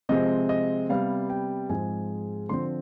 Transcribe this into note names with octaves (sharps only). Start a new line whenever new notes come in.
C3 F3 G#3 C4 D#5
D#5
C3 G3 B3 F5
G5
G#2 F3 G#3 C4 G#5
D3 F3 C4 C6